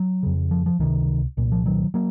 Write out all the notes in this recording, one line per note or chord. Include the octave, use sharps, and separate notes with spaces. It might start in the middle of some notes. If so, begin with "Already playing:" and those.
Already playing: F#3
F2 C#3
F3
F3
C#2 C3 D#3
C2 A#2
F3
D#3 F#3
F#3 A#3